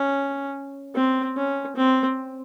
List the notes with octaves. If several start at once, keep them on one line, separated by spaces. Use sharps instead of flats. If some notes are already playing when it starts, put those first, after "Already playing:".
Already playing: C#4
C4
C#4
C4